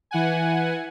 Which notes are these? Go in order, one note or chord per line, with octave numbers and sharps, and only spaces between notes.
E3 F#5 G#5